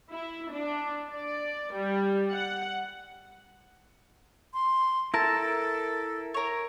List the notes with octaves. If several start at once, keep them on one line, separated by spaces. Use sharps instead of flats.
E4
D4
D5
G3
F#5
C6
E4 A4 A#4 A5
A#4 C#5